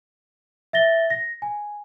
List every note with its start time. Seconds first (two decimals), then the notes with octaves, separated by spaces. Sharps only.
0.73 E5 A6 A#6 G7
1.10 A#6
1.42 G#5